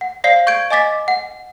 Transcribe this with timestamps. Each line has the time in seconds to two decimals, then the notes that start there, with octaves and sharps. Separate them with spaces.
0.01 F#5
0.24 C5 D5 F5 C7
0.47 C#6 G6 G#6 D7
0.71 D#5 G#5 D6 A6 B6
1.08 F#5